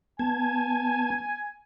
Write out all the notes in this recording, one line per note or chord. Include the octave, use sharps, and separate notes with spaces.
B3 G#5 A5 G#6